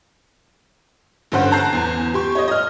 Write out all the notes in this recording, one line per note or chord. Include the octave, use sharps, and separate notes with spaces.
G2 D3 C#4 C5 F#5 F#6
A5 A#5 F#6 G6 C7
E2
G4 C6 C#6
C#5 D#5
D#5 F6